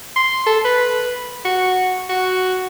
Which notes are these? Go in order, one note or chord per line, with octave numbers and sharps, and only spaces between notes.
C6
A4
B4
F#4
F#4